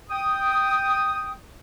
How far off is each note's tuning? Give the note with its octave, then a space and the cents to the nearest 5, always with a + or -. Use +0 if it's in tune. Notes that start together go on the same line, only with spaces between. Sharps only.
G5 +0 D#6 +0